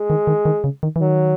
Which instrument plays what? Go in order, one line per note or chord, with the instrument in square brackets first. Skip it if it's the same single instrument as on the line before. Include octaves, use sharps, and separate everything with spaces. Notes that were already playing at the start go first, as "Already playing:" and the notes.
Already playing: [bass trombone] G#3
[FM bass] D#3
D#3
D#3
C#3
D#3
E3
[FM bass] D#3 [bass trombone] F#3